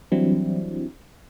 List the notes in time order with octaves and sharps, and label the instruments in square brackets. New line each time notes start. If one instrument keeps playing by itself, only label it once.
[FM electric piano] E3 F#3 G3 C4 D4 E4